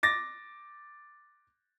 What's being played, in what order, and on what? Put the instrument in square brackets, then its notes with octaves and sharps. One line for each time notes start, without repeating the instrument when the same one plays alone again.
[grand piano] D6 A6 A#6